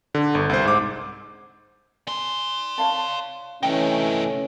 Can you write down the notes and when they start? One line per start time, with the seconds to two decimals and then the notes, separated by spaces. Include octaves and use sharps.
0.15 D3
0.35 G1
0.49 C2 C5
0.65 G#2 D6
2.07 D5 G#5 C6
2.78 C#5 F5 A5
3.63 C3 E3 A3 C#4 D#4 G5